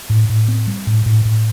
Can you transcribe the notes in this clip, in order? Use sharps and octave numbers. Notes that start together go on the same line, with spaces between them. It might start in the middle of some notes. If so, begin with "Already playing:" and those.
A2
A2
C4
G3
A2
A2
A2